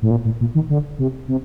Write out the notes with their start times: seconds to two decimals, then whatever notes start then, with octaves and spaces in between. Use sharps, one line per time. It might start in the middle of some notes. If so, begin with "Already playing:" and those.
0.02 A2
0.11 A#2
0.25 A2
0.41 A#2
0.55 D#3
0.69 D3
0.99 C3
1.28 C3